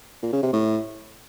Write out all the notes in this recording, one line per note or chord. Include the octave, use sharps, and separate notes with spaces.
A#2
C#3
C3
A2